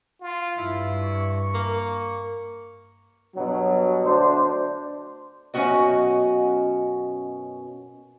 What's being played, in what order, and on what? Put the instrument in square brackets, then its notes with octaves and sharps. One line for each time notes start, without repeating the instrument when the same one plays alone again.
[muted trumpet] F4
[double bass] G2 [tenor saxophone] E4
[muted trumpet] C#6
[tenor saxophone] A#3
[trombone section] G2 B2 F#3
D2 D4 C5
[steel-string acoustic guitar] F#2 B2 G#3 C#4 F#4 D#5